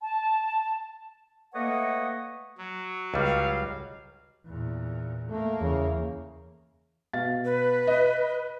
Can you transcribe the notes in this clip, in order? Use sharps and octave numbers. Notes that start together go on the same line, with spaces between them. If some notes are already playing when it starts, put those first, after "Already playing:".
A5
A3 A#3 B4 C#5 D#5 F#5
F#3
C#2 G3 F5
E2 A#2
A3 A#3
E2 C#3
B2 F5 A6
B4
D#5